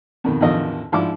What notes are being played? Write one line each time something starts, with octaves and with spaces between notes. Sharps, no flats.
F2 B2 D#3
A1 E2 D3 D#3 F3 D#5
G#2 F3 D4 E4 D6